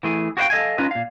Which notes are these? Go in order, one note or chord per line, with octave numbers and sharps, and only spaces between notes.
E3 A3 G#4
F#4 G4 B4 C5 F5 G5
A4 D#5 F5 G#5
C#4 D#4 F4 B4 D#5
A#2 F5